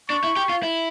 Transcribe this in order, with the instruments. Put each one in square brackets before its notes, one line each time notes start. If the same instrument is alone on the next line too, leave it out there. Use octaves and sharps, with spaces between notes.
[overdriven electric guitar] D4 [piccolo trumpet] C#6
[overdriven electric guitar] E4
G4
F4
E4